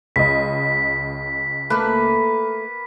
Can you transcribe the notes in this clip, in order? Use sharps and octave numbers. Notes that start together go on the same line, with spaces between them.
C#2 D#5 B6
A3 A#3 A4 B4